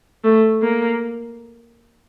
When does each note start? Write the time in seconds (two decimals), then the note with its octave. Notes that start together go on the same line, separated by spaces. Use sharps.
0.24 A3
0.62 A#3